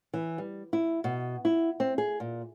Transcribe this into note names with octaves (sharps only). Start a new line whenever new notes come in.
E3
G3
E4
B2
E4
C4
G#4
A#2